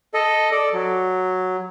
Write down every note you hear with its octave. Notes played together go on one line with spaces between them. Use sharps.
A4 D#5
A4 D5
F#3